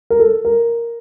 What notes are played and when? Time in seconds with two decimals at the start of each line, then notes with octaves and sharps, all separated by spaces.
0.10 A#4
0.20 A4
0.45 A#4